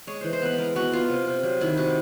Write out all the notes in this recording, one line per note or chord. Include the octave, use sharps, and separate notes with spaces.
G#3 C#5
E3 C5
C5
B3 B4
G#3 A#4
B3 F#4
B3 F4
C3
C3
F#3
D#3 E4
C3 F#4